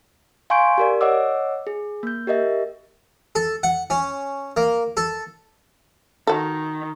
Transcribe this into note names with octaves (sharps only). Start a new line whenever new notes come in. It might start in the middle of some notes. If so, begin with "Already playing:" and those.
F5 G#5 C6 C#6 G6 D7
G4 A#4 D5
C#5 D#5 F#5 D6 E6
G#4
A#3 G6
G4 A#4 D#5 E5
A4
F#5
C#4
A#3
A4
D#3 F#4 A4